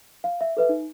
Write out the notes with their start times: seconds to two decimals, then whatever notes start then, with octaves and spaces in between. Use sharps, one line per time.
0.24 F5
0.41 E5
0.57 A4 B4 E5
0.69 D#4